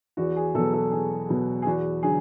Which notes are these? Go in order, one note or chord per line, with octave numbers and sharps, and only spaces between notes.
E2 F#4
G#4
B2 F#3 A4
A4
E2 G#4
B2 F#3
G#4
E2 F#4
D3 F#3 G#4